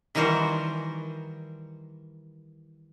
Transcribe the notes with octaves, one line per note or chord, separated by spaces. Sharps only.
D#3 E3 G3 F#4 A#4 C5